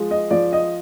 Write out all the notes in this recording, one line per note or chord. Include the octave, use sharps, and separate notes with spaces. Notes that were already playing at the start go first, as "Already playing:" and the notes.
Already playing: F3 G#3
D#5
F3 D5
D#5